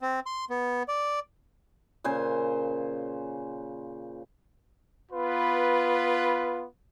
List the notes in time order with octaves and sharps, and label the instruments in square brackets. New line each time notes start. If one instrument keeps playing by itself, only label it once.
[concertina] C4
C6
B3
D5
[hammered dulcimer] A#2 C#3 C5 G#5
[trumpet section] B3 F4 B4